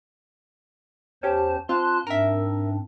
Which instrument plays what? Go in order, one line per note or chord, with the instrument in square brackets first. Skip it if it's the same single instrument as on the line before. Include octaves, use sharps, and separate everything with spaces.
[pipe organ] E2 C5 A5 [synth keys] C#4 G4
[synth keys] C4 F4 [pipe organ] A5 C6 F#6
[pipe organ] G#2 C4 D4 [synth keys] A#4 E5